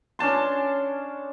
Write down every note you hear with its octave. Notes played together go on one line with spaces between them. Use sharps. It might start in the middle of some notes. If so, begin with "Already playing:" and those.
C#4 D4 A5 C6